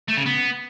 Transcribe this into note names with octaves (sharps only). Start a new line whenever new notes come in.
A3
C#3
B3